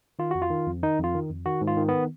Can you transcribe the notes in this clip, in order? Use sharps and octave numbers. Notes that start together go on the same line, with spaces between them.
D#3 F4
F2 F#4
F4
D#3
F2
D#3 D#4
F2
F4
D#3
F2
D#3 F#4
G#2
F4
D#3
B3